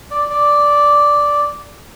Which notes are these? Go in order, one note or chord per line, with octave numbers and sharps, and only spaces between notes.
D5
D5